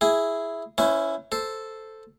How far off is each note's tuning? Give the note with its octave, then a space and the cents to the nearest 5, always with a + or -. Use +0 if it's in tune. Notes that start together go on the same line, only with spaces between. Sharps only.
E4 +0 G#4 +0
C#4 +0 E4 +0 C5 -45
A4 +0 C5 +0